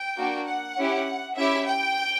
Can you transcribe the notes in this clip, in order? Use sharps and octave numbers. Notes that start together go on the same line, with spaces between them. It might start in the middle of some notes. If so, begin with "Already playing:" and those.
Already playing: G5
A#3 D4 F#4
F#5
C#4 E4 G4
C#4 E4 G4 E5
G5